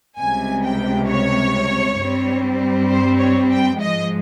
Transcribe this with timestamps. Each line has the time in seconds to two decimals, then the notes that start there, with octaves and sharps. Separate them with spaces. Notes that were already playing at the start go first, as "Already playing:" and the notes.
0.18 C#2 C3 G3 G#5
0.63 G5
1.08 C#5
1.99 G2 G3 C4
2.90 C5
3.19 C#5
3.50 G5
3.80 G#2 F3 G#3 D#5